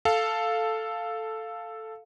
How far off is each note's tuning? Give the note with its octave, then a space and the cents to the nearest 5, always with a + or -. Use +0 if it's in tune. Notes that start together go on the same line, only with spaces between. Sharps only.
A4 +0 F5 +0